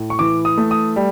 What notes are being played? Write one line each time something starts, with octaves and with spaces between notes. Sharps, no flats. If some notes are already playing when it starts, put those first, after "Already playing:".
Already playing: A2
C#6
E3 D6
D#6
A3
D#6
G3